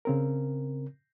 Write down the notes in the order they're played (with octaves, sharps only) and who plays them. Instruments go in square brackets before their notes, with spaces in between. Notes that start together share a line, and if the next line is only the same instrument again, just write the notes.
[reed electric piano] C#3 C4 A#4